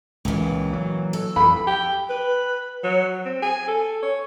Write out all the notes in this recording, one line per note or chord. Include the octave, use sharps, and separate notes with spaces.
C#2 A#2 E3
F#3
A4
F2 E3 B5
G5
B4
F#3
C4
G#5
A4
C#5